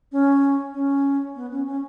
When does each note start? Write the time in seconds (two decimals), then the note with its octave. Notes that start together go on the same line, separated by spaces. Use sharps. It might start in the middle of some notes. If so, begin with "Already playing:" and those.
0.12 C#4
0.74 C#4
1.36 B3
1.51 C#4
1.66 C#4